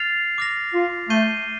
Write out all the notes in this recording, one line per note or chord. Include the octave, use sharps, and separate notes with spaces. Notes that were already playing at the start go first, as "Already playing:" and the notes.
Already playing: F6 A6 C7 F7
D6 F6 A#6 F7
F4
A3 G6 C7 D#7 G7